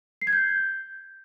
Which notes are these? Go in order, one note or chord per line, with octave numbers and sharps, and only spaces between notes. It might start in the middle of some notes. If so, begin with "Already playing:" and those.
C7
G#6
G6